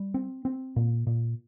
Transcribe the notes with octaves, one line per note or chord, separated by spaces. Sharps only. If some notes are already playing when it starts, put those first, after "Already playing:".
Already playing: G3
C4
C4
A#2
A#2